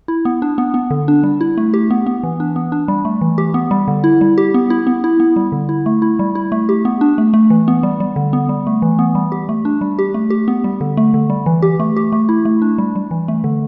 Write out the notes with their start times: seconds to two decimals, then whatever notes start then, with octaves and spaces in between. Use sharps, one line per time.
0.08 E4
0.25 B3
0.42 D4
0.58 B3
0.74 B3
0.91 D3
1.08 D4
1.23 G3
1.41 E4
1.58 A3
1.74 G4
1.90 B3
2.07 B3
2.23 E3
2.40 D4
2.56 B3
2.72 D4
2.88 G3
3.05 A3
3.21 E3
3.38 G4
3.54 B3
3.71 G3
3.88 D3
4.04 E4
4.21 G3
4.38 G4
4.54 B3
4.70 E4
4.87 B3
5.04 E4
5.20 B3
5.36 G3
5.52 D3
5.69 E4
5.86 A3
6.02 E4
6.19 G3
6.35 E4
6.52 A3
6.69 G4
6.85 B3
7.01 D4
7.18 A3
7.34 A3
7.50 E3
7.68 B3
7.83 G3
8.00 G3
8.16 D3
8.33 B3
8.49 G3
8.67 A3
8.82 E3
8.99 B3
9.15 G3
9.32 G4
9.49 A3
9.65 D4
9.81 G3
9.99 G4
10.14 A3
10.30 G4
10.48 B3
10.64 G3
10.81 D3
10.97 A3
11.14 D3
11.30 G3
11.46 E3
11.62 G4
11.80 A3
11.96 G4
12.12 A3
12.29 E4
12.45 A3
12.62 D4
12.78 G3
12.96 G3
13.11 E3
13.28 A3
13.44 D3